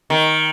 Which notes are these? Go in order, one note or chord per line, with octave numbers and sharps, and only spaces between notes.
D#3